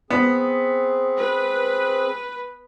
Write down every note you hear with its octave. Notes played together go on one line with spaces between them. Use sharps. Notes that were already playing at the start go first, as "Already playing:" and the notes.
B3 C4 G#4
B4